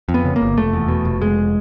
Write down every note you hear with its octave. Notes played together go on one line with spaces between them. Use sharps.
F2
B3
C#3
A#3
G1
F1 A3
E2
B2
F1
F1 G#3